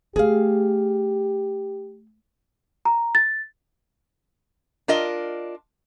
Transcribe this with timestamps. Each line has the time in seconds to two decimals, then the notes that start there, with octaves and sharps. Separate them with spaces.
0.16 A3 G4 G#4 F5
2.85 A#5
3.15 A6
4.88 D4 F4 A#4 D#5